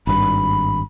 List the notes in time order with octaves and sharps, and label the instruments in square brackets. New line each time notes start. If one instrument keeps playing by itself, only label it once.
[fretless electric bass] G#1 G2 [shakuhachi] B5